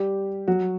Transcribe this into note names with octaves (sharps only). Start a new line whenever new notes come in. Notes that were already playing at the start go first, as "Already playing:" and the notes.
Already playing: G3 G4
F#3 F#4